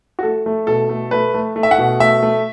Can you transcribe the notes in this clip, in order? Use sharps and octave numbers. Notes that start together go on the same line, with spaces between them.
F#4
A3 A4
A3
B2 A4
A3
A3 B4
A3
A3
E5
F#5
B2
A3 E5
A3